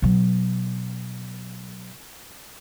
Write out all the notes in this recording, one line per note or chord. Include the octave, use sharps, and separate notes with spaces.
B2 F#3